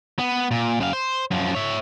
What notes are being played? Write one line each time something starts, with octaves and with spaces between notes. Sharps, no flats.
B3
A#2
F#2 F5
C5
F#2 F3
C#5 E5